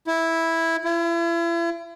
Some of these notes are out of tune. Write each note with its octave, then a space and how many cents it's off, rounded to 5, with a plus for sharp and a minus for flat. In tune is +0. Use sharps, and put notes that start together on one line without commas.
E4 -5
E4 +40